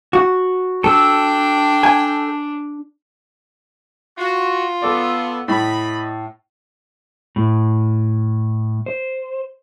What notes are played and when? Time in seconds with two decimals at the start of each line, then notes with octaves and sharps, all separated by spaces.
0.13 F#4
0.84 D4 A4 G5 E6
1.83 G#5
4.18 F4 F#4
4.82 B3 A4 D5
5.48 A2 D#5 B5
7.36 A2
8.86 C5